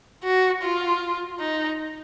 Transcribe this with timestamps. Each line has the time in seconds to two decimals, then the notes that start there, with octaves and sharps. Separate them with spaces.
0.24 F#4
0.62 F4
1.40 D#4